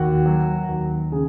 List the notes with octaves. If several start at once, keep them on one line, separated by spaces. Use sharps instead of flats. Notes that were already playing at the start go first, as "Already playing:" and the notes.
Already playing: D#2 F#4
F#3
D#2
C#3 G#4